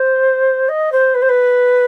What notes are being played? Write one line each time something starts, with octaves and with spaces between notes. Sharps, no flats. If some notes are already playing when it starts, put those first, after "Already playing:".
Already playing: C5
D#5
C5
B4
C5
B4